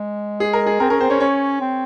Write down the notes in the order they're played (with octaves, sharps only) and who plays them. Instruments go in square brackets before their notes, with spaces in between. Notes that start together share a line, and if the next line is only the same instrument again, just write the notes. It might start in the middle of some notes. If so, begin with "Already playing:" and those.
Already playing: [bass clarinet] G#3
[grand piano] G#4
A#4
G#4
[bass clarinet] C4 [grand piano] A#4
[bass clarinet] C#4 [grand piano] A#4
[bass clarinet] C4 [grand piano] C5
[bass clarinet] C#4 [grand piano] C#5
[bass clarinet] C#4 [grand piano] C#5
[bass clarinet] C4